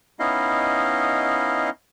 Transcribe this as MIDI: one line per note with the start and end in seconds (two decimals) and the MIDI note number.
0.19 1.70 59
0.19 1.70 61
0.19 1.70 63
0.19 1.70 64
0.19 1.70 75
0.19 1.70 77